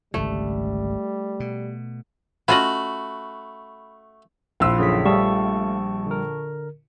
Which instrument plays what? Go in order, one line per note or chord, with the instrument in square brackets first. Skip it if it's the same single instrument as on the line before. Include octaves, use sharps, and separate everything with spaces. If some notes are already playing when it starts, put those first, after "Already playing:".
[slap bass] G#1 C#2 D3 [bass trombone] G3 [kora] A3
[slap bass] B2
[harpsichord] A3 F#4 [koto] C#4 F4 D#5 [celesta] B5 F#7
[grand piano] A#1 E6 [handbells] E4 F4 F5
[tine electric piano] F#2 D3 F3 [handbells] G#4 C#5 B6
[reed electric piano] G3 [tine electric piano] A3 F5 [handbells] A5 C#6
[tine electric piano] D3 A#4